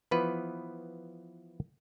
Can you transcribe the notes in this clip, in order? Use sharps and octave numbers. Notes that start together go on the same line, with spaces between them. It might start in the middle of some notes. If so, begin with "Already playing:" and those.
E3 F3 B3 B4